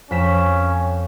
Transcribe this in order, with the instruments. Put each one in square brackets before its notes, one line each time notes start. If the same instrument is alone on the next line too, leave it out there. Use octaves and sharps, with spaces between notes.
[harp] F2 B6 E7 [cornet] C#4